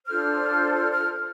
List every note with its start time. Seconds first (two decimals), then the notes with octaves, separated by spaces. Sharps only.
0.06 D4 F4 A4 C5 F6
0.74 F6
0.92 F6